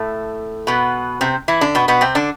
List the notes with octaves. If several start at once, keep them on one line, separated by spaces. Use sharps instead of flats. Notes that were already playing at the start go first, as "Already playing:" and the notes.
Already playing: A2 A3
B2 B3
C3 C4
E3 E4
D3 D4
B2 B3
B2 B3
C3 C4
D3 D4